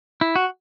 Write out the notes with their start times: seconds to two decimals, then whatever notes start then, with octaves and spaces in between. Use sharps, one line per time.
0.21 E4
0.36 F#4